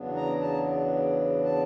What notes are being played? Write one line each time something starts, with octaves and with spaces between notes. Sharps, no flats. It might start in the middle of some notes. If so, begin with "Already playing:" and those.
Already playing: E2 C#3 F#3 B3 D4
A#5
A5
A5